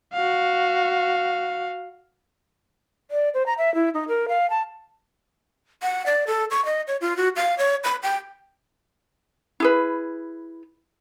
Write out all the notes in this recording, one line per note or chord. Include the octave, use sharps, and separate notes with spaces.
F#4 F5
D5
C5
A#5
E5
E4
D#4
A#4
F5
A5
F#5
D5
A4
C#6
D#5
C#5
F4
F#4
F5
C#5
B5
G5
E4 G#4 B4